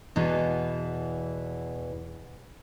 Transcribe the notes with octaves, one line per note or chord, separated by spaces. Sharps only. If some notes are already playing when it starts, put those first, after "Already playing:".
E2 B2 E3